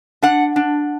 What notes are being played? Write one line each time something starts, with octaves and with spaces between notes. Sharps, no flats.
D4 F#5
D4